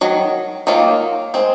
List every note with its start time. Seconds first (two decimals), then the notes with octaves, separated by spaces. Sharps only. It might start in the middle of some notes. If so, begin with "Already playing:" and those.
0.01 D#3 F#3
0.67 D#3 F#3 A#3 F4
1.34 G#3 C4